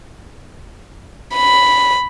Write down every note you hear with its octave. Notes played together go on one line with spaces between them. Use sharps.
B5